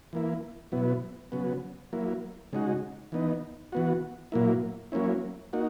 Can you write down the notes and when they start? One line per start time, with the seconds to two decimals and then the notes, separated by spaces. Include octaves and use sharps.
0.13 E3 A#3 E4
0.72 B2 F#3 B3 E4
1.32 C#3 F#3 B3
1.93 F#3 A#3 E4
2.53 C#3 G#3 D#4 F#4
3.12 E3 B3 D#4
3.72 E3 B3 F#4
4.32 A#2 F#3 A#3 E4
4.92 F#3 A#3 C#4 E4
5.53 A#3 D#4 F#4